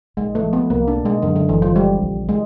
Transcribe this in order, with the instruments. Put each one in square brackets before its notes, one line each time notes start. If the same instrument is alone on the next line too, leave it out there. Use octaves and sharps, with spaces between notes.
[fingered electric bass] A#1 [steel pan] G#3
[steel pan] A3
[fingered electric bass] F3
[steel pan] B3
[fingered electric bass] C2 [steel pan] A#3
[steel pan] D4
[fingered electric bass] B2
[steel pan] G#3
[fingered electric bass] F#2 [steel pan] D3
[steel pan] D3
[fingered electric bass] F#1 [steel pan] E3
[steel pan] F3
[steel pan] G3 [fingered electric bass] G#3
[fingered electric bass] A#1
[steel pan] G#3